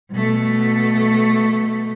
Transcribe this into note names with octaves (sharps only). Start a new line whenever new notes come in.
B2 A3